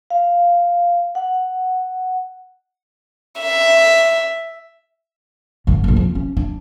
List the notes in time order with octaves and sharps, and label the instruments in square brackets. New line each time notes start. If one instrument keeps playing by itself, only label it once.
[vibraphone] F5
F#5
[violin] E5
[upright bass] G2 D3
D#1 A#1
F2
C#4
D4